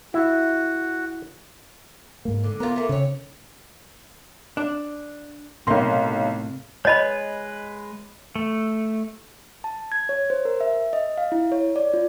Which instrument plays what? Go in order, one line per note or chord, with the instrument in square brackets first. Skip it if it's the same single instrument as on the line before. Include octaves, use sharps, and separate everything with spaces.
[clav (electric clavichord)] E4 [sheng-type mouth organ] F#4
[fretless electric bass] G#2 A#3
[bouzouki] D3
[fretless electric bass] B3 [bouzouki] F4 G4 A#4
[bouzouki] A3 A#3
[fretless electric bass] C#3 [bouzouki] C4 C#5
[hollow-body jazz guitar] D4
[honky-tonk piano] B1 C6 [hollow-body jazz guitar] A2 C3 A#3
[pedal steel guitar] G#3 B4 [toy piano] C#5 D#5 B5
[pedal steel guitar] A3
[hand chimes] A5
G#6
C#5
C5
A#4
E5
D#5
F5
E4
C#5
D5
F4